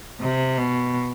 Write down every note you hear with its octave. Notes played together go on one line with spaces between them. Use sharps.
C3
B2